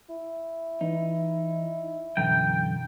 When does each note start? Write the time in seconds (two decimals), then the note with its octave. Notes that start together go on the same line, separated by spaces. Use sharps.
0.09 E4
0.81 E3 D#4
2.17 F#2 B2 D3 E3 G5 A#5